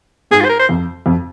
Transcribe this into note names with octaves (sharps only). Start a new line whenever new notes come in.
G#2 G#4
F4
C5
A#4
C5
F2
F2